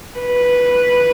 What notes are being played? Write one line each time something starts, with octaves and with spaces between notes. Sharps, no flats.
B4